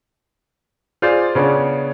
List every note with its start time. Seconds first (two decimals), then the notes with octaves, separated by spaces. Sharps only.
1.02 F4 G#4 C5 D5
1.35 C#3 B3 C#4 D4